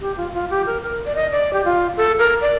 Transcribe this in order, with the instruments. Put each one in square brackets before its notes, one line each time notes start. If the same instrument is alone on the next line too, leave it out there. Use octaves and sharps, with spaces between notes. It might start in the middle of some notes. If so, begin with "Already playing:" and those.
[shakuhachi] G4
F4
F4
G4
A#4
A#4
D5
D#5
D5
G4
F4
A4
A#4
D5